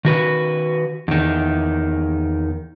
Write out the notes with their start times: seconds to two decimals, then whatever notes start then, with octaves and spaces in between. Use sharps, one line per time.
0.05 D#3 F#4 B4
1.08 E2 D#3